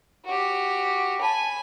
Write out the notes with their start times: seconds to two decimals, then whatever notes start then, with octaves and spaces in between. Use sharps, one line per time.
0.25 F#4 G4
1.21 G#5 A5 B5